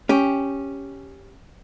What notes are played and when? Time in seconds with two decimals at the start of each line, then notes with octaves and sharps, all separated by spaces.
0.09 C#4 G4